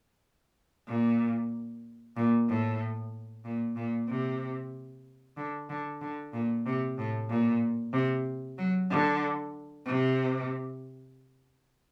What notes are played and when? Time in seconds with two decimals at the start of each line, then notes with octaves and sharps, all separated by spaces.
0.88 A#2
2.16 A#2
2.49 A2
3.45 A#2
3.76 A#2
4.09 C3
5.37 D3
5.70 D3
6.01 D3
6.33 A#2
6.66 C3
6.98 A2
7.30 A#2
7.93 C3
8.58 F#3
8.91 D3
9.86 C3